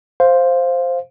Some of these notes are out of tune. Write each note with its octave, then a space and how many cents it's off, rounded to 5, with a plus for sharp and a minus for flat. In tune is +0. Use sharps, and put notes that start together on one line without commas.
C5 +0 F5 +0